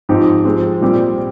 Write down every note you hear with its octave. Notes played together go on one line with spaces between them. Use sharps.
G#2 F3 C4 D#4 G4
F3 G#3 C4
A#2 G3 C4 G4